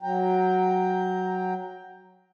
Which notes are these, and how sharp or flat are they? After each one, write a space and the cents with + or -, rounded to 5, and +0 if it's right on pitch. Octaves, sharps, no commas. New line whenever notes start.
F#3 +0 G5 +10 A#5 +0